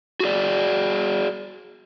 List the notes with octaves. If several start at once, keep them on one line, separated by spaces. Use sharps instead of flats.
F#4 G#4 D5